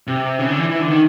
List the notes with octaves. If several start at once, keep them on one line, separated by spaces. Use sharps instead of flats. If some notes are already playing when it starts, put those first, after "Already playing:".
C3
C#3
D3
E3
E3
D3
D#3